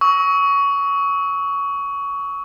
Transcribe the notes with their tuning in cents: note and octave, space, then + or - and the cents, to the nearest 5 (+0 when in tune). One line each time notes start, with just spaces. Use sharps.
C#6 +20 E6 -30